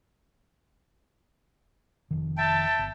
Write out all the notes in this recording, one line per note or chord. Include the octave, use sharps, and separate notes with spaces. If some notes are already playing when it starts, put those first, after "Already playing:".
F1 D#3
E5 G5 A5
G1